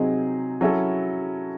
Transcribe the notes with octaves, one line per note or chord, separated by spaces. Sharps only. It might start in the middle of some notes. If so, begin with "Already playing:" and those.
Already playing: C3 F#3 C4 D#4 G#4
F#3 C#4 E4 A4